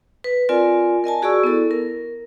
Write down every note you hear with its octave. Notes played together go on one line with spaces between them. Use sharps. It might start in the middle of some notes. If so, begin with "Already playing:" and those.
B4
C4 F4 A#4 D5 G#5
A#4 D#5 G#5 A5
F#4 G#4 D5 C#6 E6
B3 E4 A4
A#4